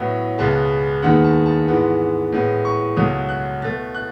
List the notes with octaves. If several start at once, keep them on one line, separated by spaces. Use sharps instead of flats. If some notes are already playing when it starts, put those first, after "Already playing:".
Already playing: A2 F#3 B3
C#2 B2 G#3 B3 A5
D#2 D#3 G#3 B3 F#5
A5
A5
G#2 E3 G#3 B3
A2 G#3 B3
C#6
C#2 B2 F#3 A3 D#6
F#6
B2 A3 A6
F#6